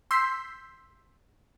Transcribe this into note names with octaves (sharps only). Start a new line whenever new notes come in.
C6 E6 G6 B6 C7